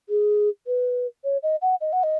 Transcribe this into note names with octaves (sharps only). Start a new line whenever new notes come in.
G#4
B4
C#5
D#5
F#5
D#5
F#5
D#5